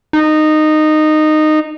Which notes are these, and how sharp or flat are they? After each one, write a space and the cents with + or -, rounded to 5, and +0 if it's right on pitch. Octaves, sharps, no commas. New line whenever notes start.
D#4 -15